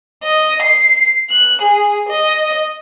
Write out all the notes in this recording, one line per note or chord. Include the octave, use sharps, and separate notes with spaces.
D#5
C7
F#6
G#4
D#5